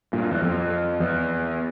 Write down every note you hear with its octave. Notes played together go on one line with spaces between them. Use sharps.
G2 A#2
E2
F2
E2